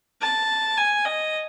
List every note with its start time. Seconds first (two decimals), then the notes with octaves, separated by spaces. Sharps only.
0.21 A5
0.77 G#5
1.05 D#5